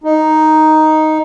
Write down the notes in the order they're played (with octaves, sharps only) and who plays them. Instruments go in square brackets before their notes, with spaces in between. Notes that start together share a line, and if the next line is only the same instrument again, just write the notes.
[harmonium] D#4